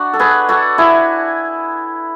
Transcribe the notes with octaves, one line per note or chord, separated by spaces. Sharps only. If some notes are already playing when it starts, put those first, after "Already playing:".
Already playing: D4 F#4
A4
G#4 B4
F#4 A4
E4 G#4